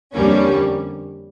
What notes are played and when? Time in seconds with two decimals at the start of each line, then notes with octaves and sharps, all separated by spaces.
0.13 F2 D3 G3 A#3 C#4